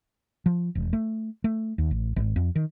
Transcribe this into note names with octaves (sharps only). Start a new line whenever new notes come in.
F3
E1
A3
A3
D#2
A1
G#1
F2
D#3